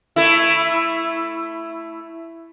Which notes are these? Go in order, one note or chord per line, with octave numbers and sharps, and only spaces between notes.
A3 E4